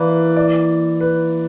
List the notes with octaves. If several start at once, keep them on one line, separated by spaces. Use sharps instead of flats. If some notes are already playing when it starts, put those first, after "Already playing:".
Already playing: E3 A#3 B4 D5
D5
B4